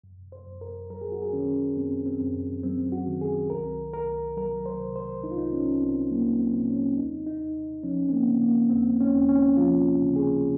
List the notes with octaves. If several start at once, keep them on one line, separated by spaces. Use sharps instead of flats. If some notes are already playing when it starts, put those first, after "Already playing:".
F#2
C5
F#2
A#4
F#3 A#4
G#4
F#4
G#4
D#3 C#4
F#2 C4
C4
F#2
F#3 C4
F#4
D#3
G#4
C2 A#4
C2 A#4
F#3 A#4
C5
C3
C5
C2 D#4
F4
D#4
C#4
C2
C4
F#3 A#3
C4
C3
C4
C#4
D#2 D#4
D#4
D#2
F3 C#4
C4
A#3
C#3
A#3
D#2 C4
C#4
D#2 C4
C#4
F3 F4
C#3
G#4